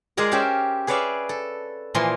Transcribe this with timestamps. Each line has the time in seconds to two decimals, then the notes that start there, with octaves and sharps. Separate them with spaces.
0.17 G#3 F4 G#4 A#4 D5
0.31 C#4 G4 C5 E5 F5
0.87 G#4 B4 C#5 D5 E5 F5
1.29 A4
1.94 A#2 E3 F3 A#4 C6